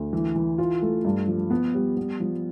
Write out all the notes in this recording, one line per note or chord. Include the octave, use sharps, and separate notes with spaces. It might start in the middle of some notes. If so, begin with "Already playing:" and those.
Already playing: D2
E3
E3
F4
A3
G2
F3
B3
G3
B3
F3